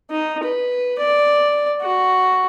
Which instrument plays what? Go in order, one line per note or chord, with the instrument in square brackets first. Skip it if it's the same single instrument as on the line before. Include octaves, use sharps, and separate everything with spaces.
[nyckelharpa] D#4
B4
D5
F#4